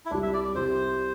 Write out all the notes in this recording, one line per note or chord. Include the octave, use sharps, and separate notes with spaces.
E4
C2 C3 G3 D4
E5
D5
D5
C2 C3 G3 C5